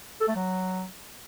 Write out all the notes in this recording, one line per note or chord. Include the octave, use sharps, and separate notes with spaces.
A4
A3
F#3